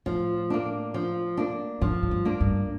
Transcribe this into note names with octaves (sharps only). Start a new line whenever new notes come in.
A2 F3
A#3 D4
F3
A#3 D4
A2 F3
A2
G2
A#3 D4
G2